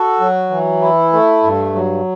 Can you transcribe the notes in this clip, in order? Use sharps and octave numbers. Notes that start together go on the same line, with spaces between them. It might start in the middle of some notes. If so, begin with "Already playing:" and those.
Already playing: F#4 A4
F#3
E3
E4
A3
G2
F#3